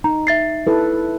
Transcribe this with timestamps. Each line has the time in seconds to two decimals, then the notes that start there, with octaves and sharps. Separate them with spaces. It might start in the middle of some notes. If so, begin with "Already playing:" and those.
0.04 D#4 A#5
0.27 E5 A6 C7
0.67 E4 A4 B4